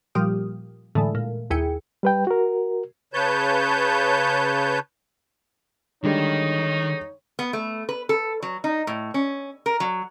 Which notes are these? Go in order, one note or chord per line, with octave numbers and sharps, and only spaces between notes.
A#2 F3 G3 G4 D#6 F6
A2 D3 E3 G#3 A3
A#2
D#2 E4 G#4 G5 C#7
G3 B4 G5
F#4 A#4
C#3 B4 C#5 A5 G6
D3 D#3 G3 G#3 D#4 C#5
B3
A3
B4
A4
F#3
D#4
A2
C#4
A#4
F#3